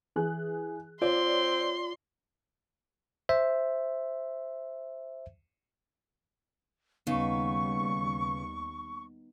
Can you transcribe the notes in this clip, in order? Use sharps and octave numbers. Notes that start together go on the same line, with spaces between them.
E3 G#4 F#6
C4 F4 C#5 D5 C6
C5 E5
D#2 C#3 G3 B3 D#4 B4 C#6